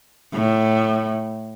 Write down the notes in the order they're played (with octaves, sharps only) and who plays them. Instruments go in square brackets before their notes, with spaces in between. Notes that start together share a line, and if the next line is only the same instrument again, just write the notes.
[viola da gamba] A2